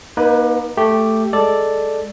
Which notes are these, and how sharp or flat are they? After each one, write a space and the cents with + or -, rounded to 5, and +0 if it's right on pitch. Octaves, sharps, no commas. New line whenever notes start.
A#3 +40 D#4 +5 B4 +0
A3 +0 G4 +0
G#3 +0 A4 +0 D5 +0